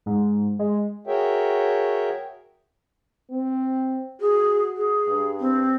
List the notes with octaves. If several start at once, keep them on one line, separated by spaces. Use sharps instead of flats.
G#2
G#3
F#4 G#4 A#4 C#5 E5 G5
C4
F#4 G#4
G#4
G2
C4